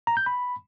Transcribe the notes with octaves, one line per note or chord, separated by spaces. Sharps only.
A#5
G6
B5